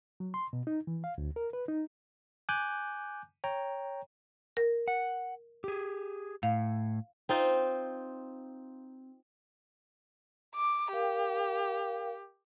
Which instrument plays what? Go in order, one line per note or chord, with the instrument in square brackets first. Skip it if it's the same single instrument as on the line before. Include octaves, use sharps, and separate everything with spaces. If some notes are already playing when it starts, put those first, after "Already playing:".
[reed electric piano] F#3
C6
B2
D#4
E3
F5
D2
A#4
B4
D#4
[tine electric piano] G#5 D6 F#6 G6
C#5 G5 A#5
[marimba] A#4
[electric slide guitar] F#5
G4 G#4
[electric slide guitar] A2 [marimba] F5
[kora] C4 D#4 F4
[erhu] D6
[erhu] G4 [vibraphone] A#4 F5 G5